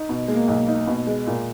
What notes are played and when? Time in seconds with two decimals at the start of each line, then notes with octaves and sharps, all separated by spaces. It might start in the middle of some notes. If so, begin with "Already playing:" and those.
Already playing: D#4
0.09 B2
0.28 G#3 A#3
0.48 B1
0.68 D#4
0.87 B2
1.07 G#3
1.27 A#2